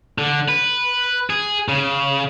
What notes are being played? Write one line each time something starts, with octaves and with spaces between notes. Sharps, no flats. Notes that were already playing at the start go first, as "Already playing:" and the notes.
D3
B4
G#4
C#3